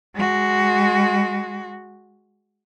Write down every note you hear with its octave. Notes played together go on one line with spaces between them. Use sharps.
G#3 F#4